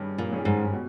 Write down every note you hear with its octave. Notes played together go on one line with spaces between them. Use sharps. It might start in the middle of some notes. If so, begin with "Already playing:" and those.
Already playing: G2 D#3 G3 C#4 G#4
A#2
D#3 G3 C#4 G#4
G#2
B2